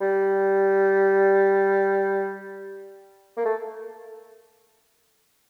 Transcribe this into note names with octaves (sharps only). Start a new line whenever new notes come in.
G3
A#3
A3